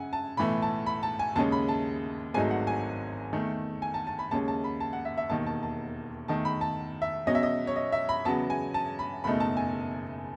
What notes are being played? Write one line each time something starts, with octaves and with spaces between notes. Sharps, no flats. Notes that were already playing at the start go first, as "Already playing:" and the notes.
Already playing: F#2 C#3 F#5 G#5
A5
B1 A2 E3 A3 B5
A5
B5
A5
G#5
D#2 C#3 G#3 C#4 A5
B5
A5
G#1 G#2 F#3 A3 D#4 G#5
F#5
G#5
E2 D#3 A3
G#5
A5
A5
B5
D#2 C#3 G#3 C#4 A5
A5
B5
A5
F#5
E5
E5
E1 D#2 D#3 A5
A5
A5
E2 D#3 A3 A5
B5
A5
E5
E2 B2 F#3 C#4 D#5
E5
D#5
C#5
D#5
E5
B5
E2 C#3 F#3 B3 A5
G#5
A5
B5
F#1 E2 B2 A3 D#4 B5
A5
G#5